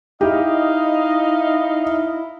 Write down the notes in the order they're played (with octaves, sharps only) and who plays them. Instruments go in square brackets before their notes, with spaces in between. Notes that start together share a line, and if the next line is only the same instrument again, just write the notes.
[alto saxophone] D#4 [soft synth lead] E4 [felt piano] G4 [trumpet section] D#5 F5